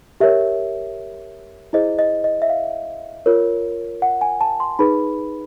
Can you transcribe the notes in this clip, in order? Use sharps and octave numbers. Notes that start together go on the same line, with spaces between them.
G4 A#4 C#5 E5
E4 G#4 C5 D#5
D#5
D#5
E5
F5
F4 A#4 C#5
F#5
G#5
A5
C6
D#4 G#4 B4 B5